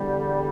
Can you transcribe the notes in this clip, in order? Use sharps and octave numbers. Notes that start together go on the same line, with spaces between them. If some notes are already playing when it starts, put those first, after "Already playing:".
Already playing: E2 D3 G3